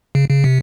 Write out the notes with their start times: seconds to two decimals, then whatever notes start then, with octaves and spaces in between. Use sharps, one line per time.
0.15 C#3
0.30 C#3
0.44 C3